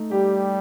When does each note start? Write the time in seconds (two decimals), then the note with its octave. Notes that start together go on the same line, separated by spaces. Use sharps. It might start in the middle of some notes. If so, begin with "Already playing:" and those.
Already playing: A3 D#4
0.11 G3 G4